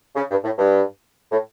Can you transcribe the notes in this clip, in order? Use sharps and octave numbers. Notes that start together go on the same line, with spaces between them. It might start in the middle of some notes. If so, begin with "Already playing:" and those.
C#3
G2
A2
G2
A2